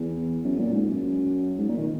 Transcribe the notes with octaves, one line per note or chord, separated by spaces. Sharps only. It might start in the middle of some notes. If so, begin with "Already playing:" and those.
Already playing: E2
F#2
A#2
G#2
F#2
G#2
A#2
D#3